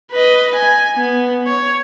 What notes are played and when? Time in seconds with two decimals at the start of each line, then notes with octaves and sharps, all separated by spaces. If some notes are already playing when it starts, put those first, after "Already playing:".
0.12 B4 D#5
0.55 G#5
0.97 B3
1.47 C#5